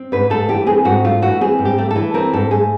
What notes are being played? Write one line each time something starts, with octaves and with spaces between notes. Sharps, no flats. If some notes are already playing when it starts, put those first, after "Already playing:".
Already playing: C4
G#2 B4
A3 A4
E3 G4
C4 G#4
G#2 F#4
A3 F4
E3 F#4
C4 G#4
G#2
G4
A3
A4
E3
C4 A#4
G#2 A4
A3 G#4